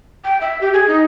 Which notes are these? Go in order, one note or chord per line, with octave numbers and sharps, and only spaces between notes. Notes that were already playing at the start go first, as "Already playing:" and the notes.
G5
E5
G4
G#4
D#4